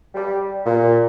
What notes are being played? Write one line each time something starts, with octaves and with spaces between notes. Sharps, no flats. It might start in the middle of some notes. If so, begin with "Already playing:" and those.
G3
A#2